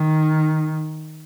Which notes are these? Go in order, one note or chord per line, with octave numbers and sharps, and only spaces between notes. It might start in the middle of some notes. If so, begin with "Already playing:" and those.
Already playing: D#3